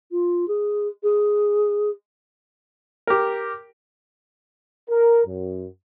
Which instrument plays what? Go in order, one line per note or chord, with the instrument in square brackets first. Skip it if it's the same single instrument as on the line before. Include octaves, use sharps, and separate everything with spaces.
[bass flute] F4
G#4
G#4
[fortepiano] G4 A#4
[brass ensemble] A#4
F#2